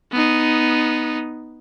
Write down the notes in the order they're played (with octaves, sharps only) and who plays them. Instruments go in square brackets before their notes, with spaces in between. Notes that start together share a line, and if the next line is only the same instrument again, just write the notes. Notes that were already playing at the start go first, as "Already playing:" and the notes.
[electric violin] B3 D#4